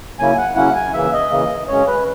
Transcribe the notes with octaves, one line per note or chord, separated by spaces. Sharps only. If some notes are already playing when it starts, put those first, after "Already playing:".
C#3 F#3 A#3 C#4 E4 G#5
F#5
C#3 F#3 A#3 C#4 E4 F#5
G#5
C#3 E3 A#3 E5
D#5
C#3 E3 A#3
F#2 C#3 G#3 C#4 C#5
B4